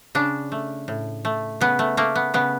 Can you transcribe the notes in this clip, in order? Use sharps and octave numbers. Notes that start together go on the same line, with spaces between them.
C#3 D4
A3
A2
A3
C#3 B3
A3
A3 A#3
B3
C#3 B3